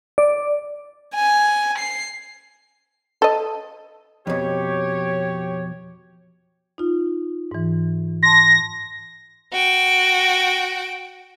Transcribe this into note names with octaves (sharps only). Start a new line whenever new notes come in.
D5
G#5
C7
A4 D#5
F2 B2 G4 C#5
D#4 F4
G#2 E3
A5 C6 A#6
F#4 G5